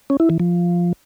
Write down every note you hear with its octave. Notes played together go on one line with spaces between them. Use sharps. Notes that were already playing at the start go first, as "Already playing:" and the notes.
C#4
E4
E3
F3